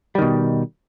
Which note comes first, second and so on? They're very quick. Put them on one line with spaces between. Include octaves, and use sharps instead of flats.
G3 D#3 B2